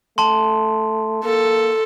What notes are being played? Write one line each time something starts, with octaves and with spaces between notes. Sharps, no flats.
A3 A5 C6
A#3 A4